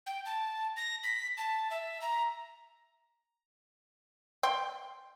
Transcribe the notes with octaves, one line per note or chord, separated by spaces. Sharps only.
G5
A5
A#6
B6
A5
E5
A#5
G5 C6